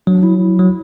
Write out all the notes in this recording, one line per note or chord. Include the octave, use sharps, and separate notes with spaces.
F#3 D4
E4
E4
F#3